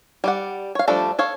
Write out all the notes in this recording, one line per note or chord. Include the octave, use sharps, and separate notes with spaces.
G3 D5 F#5
C#5 F5
F3 G3 A3 D4 A4
A4 C#5 F5